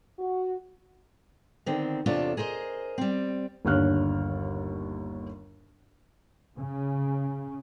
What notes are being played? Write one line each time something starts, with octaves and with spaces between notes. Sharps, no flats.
F#4
D3 D#3 C4
E2 C3 D4 F4 A4 C#5
G#4 A#4 C5 C#5 D#5
G3 C4
G1 D#2 D3 C#5 F6 F#6
C#3